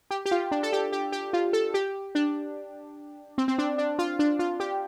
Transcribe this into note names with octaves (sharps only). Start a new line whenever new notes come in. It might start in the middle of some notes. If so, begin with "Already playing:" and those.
G4
G4
F4
D4
A4
G4
G4
G4
F4
A4
G4
D4
C4
C4
D4
D4
F4
D4
F4
G4